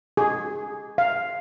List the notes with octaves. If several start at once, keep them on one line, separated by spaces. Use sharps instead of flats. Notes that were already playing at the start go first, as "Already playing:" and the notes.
G#4
F5